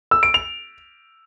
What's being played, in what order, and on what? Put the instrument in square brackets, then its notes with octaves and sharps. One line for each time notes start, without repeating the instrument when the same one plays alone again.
[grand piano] E6
D7
F7